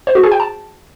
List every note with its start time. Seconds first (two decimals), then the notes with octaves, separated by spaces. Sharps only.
0.07 C5
0.15 F#4
0.23 G#4
0.32 G5
0.40 A5